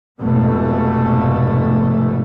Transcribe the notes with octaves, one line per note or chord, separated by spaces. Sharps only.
F1 G#2 B2 A3